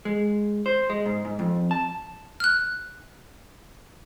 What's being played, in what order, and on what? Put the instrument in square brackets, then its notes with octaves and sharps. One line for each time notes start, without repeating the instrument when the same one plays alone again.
[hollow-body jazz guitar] G#3
C5
G#3
G#2
G#2
F2
A5
[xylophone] F6 F#6